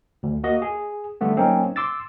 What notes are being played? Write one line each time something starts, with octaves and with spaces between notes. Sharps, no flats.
D2
A#3 F#4 D#5
G#4
D3 G3 A3 B3
F#3 A#3 C4 C#4 D#4
C6 D6 E6 A6